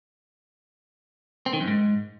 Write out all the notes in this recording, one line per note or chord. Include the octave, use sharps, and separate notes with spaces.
C4
D#3
F#2
G#2